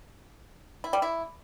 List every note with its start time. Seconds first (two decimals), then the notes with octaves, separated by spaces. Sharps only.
0.84 E4
0.93 G3
1.02 E4